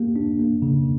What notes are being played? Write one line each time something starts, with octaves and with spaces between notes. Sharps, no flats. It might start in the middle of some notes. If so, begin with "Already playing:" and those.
Already playing: A#3 G4
D4
A#3
C#3